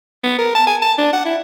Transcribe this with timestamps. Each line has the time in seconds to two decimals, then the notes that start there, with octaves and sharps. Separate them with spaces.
0.24 B3
0.39 A#4
0.55 A5
0.67 G#5
0.82 A5
0.98 D4
1.13 F#5
1.25 E4